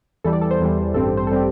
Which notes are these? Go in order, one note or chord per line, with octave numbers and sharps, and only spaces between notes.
E2 E3 G3 A4
D5
A4
C5
E2 E3 G3
A1 G2 G3 C4 A4
G4
C5
A4
G3 C4 G4